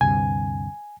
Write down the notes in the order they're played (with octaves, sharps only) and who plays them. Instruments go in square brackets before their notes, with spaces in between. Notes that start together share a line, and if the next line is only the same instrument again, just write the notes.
[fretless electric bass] D2 G2 C3 [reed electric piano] G#5